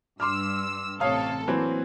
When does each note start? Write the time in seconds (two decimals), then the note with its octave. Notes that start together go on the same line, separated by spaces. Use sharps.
0.20 G2 C6 D6 E6 F6
1.00 A1 C3 A4 C#5 F5 D#6
1.48 E3 F#3 A#3 C4